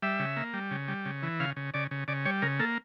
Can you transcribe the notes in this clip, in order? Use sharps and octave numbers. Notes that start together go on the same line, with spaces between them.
G3 E5
C#3
A#3
G3
C#3
G3
C#3
E3
C#3 F5
C#3
C#3 D5
C#3
C#3 D5
G3 C#5
C#3 A#4
A#3 A4